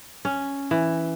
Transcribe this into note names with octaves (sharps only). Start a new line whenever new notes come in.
C#4
E3